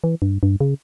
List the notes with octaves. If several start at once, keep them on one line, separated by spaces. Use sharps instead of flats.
E3
G2
G2
C#3